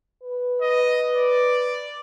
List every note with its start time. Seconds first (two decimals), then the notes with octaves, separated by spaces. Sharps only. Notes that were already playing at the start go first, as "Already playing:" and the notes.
0.23 B4
0.62 D#5
1.16 D5